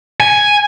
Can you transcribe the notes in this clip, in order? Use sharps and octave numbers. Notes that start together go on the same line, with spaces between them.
G#5